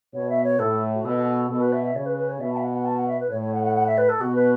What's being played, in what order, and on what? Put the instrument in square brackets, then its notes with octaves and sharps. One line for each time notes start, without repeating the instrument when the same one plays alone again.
[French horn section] B2 [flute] C#5
[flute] E5
C#5
[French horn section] A2 [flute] A4
[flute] F#4
[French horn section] B2 [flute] A4
[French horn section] B2 [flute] A4
[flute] B4
E5
E5
[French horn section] C#3 [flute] C#5
[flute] B4
B4
C#5
[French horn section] B2 [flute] E5
[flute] A5
E5
F#5
F#5
A5
F#5
E5
B4
[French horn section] A2 [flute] C#5
[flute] C#5
F#5
F#5
F#5
E5
B4
A4
[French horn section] B2 [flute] F#4
[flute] B4